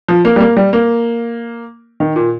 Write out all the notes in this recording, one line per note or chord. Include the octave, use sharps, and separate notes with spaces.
F3
A#3
G3
A#3
G3
A#3
D#3
A#2